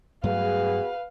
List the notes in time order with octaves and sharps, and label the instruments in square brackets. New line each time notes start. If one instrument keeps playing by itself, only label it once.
[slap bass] G2 F#3 A3 [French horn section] B3 F#4 G#4 [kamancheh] B4 F5